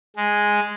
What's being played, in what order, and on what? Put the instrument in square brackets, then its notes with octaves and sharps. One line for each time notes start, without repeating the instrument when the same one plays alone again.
[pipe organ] G#3